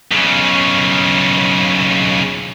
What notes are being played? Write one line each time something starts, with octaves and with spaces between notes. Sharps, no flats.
B1 C#3